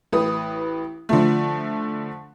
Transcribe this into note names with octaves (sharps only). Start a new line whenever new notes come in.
A1 B4 D#6
D3 F3 A3